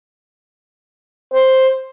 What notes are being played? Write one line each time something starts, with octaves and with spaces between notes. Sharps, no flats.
C5